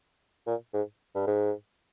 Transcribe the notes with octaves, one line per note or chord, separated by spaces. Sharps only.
A#2
G#2
G2
G#2